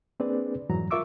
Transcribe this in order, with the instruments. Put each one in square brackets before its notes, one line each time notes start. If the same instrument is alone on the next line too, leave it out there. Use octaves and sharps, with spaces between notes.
[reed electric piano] A#3 C4 D4 G#4 B4 D5
F2 G#2 E3 F#3 A#5
F4 A#4 E5 C#6 D6 E6